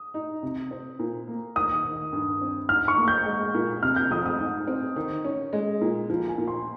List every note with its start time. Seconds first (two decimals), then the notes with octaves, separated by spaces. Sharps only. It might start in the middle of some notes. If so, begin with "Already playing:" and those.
Already playing: D#6
0.14 D#4
0.43 C3
0.71 C4
0.99 A#2
1.28 A#3
1.56 D#3 D#6
1.84 D#2
2.13 G2
2.41 C4
2.69 G#2 F6
2.88 C#6
2.97 A#3
3.08 G6
3.26 G#3
3.54 A#2
3.83 C3 F6
3.96 G6
4.11 F2 D#6
4.26 D#6
4.40 G#2
4.68 C4
4.96 D#3
5.24 C#4
5.53 G#3
5.81 A#2
6.10 F3
6.28 G#5
6.38 A#2
6.48 C6